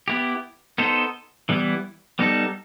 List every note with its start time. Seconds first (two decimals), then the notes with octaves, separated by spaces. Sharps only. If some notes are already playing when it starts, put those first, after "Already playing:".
0.08 B3 E4 G4
0.78 B3 D#4 A4 C5
1.49 E3 G3 B3 E4
2.19 G3 B3 D#4 A4